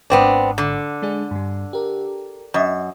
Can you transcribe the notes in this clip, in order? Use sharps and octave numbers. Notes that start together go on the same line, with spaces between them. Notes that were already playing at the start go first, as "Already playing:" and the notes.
G#1 G#2 B3 C4 D4
D3
G#3 D4 G#4
G2 G3
G4 A#4
F#2 D#5